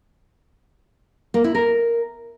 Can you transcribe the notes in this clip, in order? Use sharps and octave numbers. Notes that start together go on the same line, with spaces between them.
A#3
E4
A#4